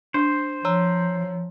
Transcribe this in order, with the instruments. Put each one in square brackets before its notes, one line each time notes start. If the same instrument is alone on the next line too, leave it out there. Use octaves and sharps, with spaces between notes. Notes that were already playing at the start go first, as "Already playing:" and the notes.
[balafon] D4 [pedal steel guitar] C5
[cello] F3 [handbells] C#5 A#5 E6